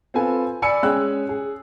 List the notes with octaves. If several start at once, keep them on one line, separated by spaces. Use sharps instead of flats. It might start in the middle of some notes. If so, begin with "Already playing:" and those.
C4 F4 A4 B4 G#5
D5 G#5 B5 E6 C#7
G#3 C#4 G#4 G5 E6 F#6
G#4